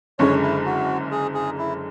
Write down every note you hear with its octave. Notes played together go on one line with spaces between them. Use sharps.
F#1 F#2 D3 G#3 C#5
E4
F#4
G#4
G#4
E4